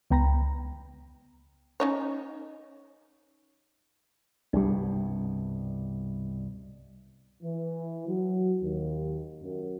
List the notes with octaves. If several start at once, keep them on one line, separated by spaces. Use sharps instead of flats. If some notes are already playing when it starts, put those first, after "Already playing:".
C#2 B3 G5 A#5 B5 A#6
C#4 D#4 C#5
C2 G2 B2 G3 D4
E3
F#3
D#2
F#2